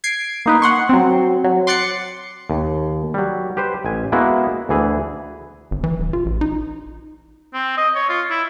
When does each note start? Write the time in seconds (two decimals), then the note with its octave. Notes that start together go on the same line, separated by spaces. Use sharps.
0.04 G#6 C7 D7
0.46 A#3 D#4 B4
0.62 F#5 C6 C#6
0.89 F#3 C4
1.44 F#3
1.67 C6 D6 F#6 A6 C7 C#7
2.50 D#2
3.14 F#3 G3
3.57 G4 B4 C5
3.85 A1 G#5
4.12 G#3 A#3 B3 E4 F#4
4.69 D2 E3 G#4
5.71 G1
5.84 E3
6.00 D#1
6.13 F4
6.26 A1
6.41 D#4
7.54 C4
7.77 D#5
7.95 C#5
8.09 F4
8.30 E4